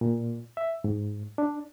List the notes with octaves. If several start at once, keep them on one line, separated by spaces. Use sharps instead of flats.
A#2
E5
G#2
D4